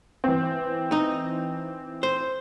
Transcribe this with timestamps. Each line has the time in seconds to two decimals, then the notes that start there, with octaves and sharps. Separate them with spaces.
0.24 E3 C4
0.92 D#4
2.03 C5